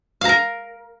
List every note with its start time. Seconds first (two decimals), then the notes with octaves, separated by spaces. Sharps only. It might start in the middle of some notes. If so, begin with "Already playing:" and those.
0.21 F5
0.25 A#5
0.29 A#4